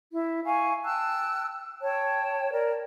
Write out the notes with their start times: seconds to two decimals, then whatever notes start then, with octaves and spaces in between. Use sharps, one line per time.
0.13 E4
0.46 F5 G#5 C#6
0.84 G5 A5 E6 F#6
1.82 C#5 G5 A5
2.52 A#4 D5